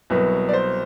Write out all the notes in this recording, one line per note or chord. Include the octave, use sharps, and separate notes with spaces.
C2 B2 F#3 B3 B4
D5
C5